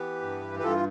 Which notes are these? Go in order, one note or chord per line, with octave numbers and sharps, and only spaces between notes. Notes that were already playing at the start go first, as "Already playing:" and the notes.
Already playing: E3 B3 G4 B4
G2
B4
G2 F4 A4